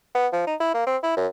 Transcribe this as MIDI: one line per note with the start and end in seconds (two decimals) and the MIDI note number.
0.14 0.27 59
0.33 0.43 53
0.47 0.55 63
0.60 0.73 64
0.74 0.86 58
0.87 0.96 60
1.03 1.15 64
1.17 1.27 42